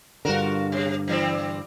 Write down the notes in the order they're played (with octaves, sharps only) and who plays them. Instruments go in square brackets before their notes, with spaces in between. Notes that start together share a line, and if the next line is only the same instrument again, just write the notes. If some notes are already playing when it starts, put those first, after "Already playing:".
[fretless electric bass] G2 D3 [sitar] F4 F#4 A#4
[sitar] C3
E3 G3 C4